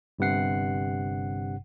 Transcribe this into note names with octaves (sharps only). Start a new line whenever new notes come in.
G1 G2 C3 F#5 C7